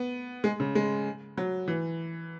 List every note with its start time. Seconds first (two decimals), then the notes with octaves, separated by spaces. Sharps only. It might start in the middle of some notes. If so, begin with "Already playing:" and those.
Already playing: B3
0.44 G#3
0.60 C#3
0.75 G#3
1.38 F#3
1.68 E3